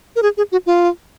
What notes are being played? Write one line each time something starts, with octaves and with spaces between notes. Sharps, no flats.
A#4
G#4
G#4
F#4
F4